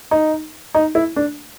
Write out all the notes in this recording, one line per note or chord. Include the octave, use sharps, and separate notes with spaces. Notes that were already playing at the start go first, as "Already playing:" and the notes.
D#4
D#4
E4
D4